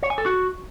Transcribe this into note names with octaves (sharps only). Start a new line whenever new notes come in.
C#5
G#5
A4
F#4